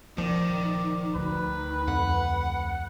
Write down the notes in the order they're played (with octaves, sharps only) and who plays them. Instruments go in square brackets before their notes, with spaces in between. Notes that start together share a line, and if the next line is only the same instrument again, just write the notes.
[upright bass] D#1 [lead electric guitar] D#3 [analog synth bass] F3 [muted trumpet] D5
[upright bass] D2 [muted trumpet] B4
[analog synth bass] F2 [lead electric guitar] F#5